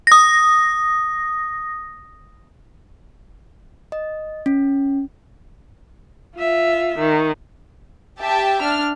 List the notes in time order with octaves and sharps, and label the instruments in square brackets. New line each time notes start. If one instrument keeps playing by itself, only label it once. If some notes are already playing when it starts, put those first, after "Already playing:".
[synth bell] D#6 A#6
[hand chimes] D#5
C#4
[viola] F4 E5
D#3
[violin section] G4 E5 G5 A5
D4 F6